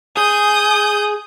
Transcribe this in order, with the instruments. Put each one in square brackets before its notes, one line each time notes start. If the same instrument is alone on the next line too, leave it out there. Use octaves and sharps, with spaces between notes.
[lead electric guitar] G#4 [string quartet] D#6 G6